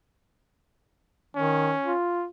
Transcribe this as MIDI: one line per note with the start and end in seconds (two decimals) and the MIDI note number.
1.35 1.74 51
1.35 1.94 61
1.84 2.26 65